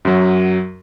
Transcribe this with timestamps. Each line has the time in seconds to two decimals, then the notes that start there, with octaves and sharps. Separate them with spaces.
0.05 F#2 F#3